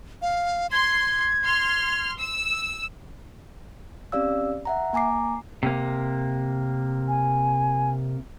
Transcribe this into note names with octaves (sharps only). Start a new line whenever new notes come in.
F5
C6 G#6
C6 F6
E6
C4 C#4 G4 D5 F5 E6
E5 F#5 A#5
A#3 G#5 A#5 D6 C7
C3 A#3
G#5